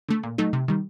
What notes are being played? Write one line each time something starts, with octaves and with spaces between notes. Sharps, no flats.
D3 A3
A#2
F#3 A3 D#4
C3
D#3 G3